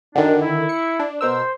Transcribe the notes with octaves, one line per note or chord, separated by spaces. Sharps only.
F#2 D3 D#3 D4
E4
C#7
D4
B2 A#4 C5 E6